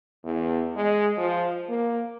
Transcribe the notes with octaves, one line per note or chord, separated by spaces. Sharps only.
E2
G#3
F3
A#3